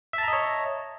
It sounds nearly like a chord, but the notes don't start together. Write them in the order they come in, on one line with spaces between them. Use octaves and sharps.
E5 A5 A#5 D#5 C#5